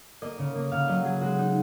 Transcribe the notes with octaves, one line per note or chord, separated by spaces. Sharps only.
A#3 D#5
C#3
A#3
C#3 F5
F#3 D#5
F#3 G#4
G#3 F#4
D#4